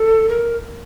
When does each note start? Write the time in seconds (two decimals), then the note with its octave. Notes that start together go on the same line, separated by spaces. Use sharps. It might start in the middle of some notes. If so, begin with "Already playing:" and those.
Already playing: A4
0.29 A#4